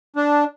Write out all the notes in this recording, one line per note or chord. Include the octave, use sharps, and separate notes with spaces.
D4